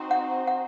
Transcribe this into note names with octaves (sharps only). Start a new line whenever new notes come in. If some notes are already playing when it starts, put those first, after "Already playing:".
Already playing: C4 D#4 F#4 C5
F#5
F#5